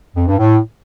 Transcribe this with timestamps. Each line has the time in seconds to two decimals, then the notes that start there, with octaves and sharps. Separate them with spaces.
0.16 F2
0.27 G2
0.38 A2